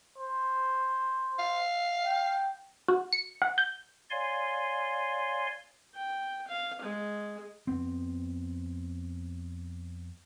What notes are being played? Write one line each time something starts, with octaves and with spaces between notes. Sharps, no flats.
C5
F5
G5
F#4
C#7
F#5
G6
C#5 D5 F5 G#5 C6
G5
F5
G#3
F2 B3 C4